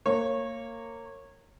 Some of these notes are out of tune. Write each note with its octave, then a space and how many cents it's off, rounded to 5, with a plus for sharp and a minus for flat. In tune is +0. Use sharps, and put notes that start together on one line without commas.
A#3 -20 C#5 -20